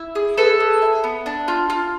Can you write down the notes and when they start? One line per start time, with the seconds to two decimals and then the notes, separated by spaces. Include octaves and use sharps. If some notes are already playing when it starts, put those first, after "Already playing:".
Already playing: E4
0.15 G#4
0.38 G#4 A4 B4
0.60 G#4
0.82 E4
1.04 B3
1.26 D4
1.48 F4
1.70 F4